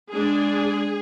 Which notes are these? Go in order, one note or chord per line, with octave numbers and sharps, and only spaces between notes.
G#3 D4 G#4